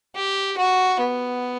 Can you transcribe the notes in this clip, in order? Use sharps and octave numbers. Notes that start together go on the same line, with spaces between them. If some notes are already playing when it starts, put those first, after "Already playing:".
G4
F#4
B3